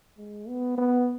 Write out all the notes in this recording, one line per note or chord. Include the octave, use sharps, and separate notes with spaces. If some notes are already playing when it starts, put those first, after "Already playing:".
G#3
B3
B3